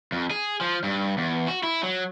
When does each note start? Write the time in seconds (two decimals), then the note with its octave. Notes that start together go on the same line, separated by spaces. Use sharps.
0.12 F2
0.31 G#4
0.61 F3
0.84 G2
1.18 E2
1.48 F#4
1.63 E4
1.83 F#3